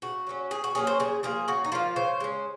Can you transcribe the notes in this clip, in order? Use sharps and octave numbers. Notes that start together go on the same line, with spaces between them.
C#3 F#4
F#3 A#3 C#4
C#3 G#4
F#4
F#3 A#3 C#4 G#4
C5
C#3 G#4
F3 A#3 G#4
C#3 F#4
D#4
F3 A#3 F4
C#3 C5
G#3 C#4